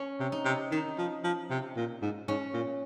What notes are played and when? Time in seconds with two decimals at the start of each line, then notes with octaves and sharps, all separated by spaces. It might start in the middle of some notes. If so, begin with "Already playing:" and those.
Already playing: C#4
0.20 C3
0.32 D#4
0.45 C3
0.71 D#3 D#4
0.98 F3
1.24 F3
1.50 C3
1.77 A#2
2.02 G#2
2.28 G#2 C#4
2.54 A#2